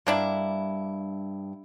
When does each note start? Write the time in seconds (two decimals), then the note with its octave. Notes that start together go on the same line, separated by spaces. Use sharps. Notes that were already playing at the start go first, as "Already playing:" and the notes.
0.07 G2 A#3 D4 E4